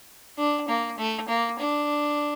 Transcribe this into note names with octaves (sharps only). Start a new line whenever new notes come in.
D4
A#3
A3
A#3
D4